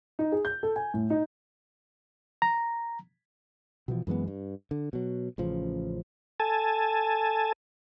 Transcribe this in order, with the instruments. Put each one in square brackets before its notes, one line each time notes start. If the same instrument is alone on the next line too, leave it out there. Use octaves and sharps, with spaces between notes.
[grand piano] D#4
G#4
G6
A4
G#5
A2
D#4
[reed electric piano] A#5
[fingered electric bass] B2 E3 F3
F#2 E3 G#3 B3
G2
D3
B2 F#3
A1 C#3 F3
[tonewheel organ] A4 G#5 A5